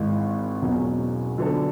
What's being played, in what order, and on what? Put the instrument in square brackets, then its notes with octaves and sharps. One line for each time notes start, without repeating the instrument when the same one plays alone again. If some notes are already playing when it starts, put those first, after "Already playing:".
Already playing: [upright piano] G#1 G#2 E3 G#3
E1 E2 B2 F#3 C#4
D3 F#3 B3 D4 A4